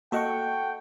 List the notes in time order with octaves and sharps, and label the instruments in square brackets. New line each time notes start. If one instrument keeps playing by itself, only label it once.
[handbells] A#3 F#4 D#5 [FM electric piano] A4 F#5 C#6 [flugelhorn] G5